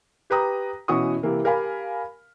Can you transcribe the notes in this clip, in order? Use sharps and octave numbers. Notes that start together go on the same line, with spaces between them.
G4 B4 G5 A#5 D#6
B2 E3 C#4 F#4 C#6 D#6
C3 E3 A#3
G4 A#4 F5 G#5 B5